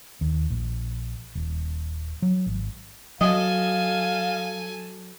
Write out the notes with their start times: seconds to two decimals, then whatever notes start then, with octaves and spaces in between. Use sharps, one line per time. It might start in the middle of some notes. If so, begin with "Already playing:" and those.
0.21 D#2
0.50 A#1
1.35 D#1
2.22 F#3
2.46 G#1
3.21 F#3 A4 D#5 F5 G#5